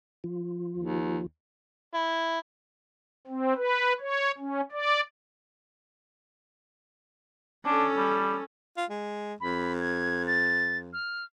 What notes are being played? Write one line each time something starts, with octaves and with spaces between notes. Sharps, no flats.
F3 F4
D#2
E4
C4
B4
C#5
C#4
D5
C#4 D4 A4
G3
F4
G#3
F2 B5
G#6
A6
F6